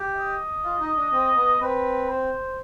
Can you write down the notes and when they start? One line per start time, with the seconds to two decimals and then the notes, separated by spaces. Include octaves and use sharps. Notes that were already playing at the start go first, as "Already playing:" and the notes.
Already playing: G4
0.16 D#5
0.64 F4
0.80 D#4
0.96 D4
1.12 C4
1.36 B3
1.60 C4 B4
2.09 C5